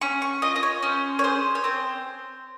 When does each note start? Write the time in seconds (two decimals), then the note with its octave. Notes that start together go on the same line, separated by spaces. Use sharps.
0.01 C#4 C#6
0.22 C#6
0.42 F4 D#5
0.56 D#5
0.63 C#5
0.83 C#4 C5
1.19 C#5
1.24 G#4 C5
1.55 C#5
1.64 C4 C5